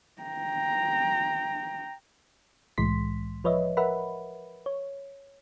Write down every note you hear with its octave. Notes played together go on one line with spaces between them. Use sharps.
G5 A#5
C2 A2 E3 G#3 C6 B6
F3 B4 C#5 D#5 E5
A#4 B4 E5 F#5 B5
C#5